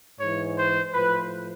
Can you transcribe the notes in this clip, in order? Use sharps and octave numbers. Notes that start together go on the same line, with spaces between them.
G#2 E3 C#5
C5
A2 F3 B4